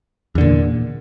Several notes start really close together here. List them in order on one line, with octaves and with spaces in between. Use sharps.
E2 D3 A#2